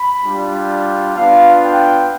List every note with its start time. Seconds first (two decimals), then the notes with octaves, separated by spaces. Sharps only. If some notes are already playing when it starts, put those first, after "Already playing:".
Already playing: B5
0.23 G3 D4 F4
1.16 B3 D4 F4 F5
1.63 G5